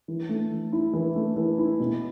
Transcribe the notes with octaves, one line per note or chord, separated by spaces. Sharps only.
E3
A3
E3
E4
E3
A3
E3
E4
B2